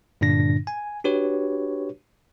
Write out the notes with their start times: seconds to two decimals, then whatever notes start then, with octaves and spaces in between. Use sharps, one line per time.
0.21 G2 A#2 D3 D4 A#6
0.67 G#5
1.04 D4 F#4 G4 B4 C#5